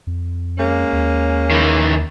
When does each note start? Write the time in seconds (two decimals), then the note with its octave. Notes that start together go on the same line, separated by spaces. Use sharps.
0.07 F2
0.58 G#3 A#3 C#4
0.93 D#2
1.51 D#3 E3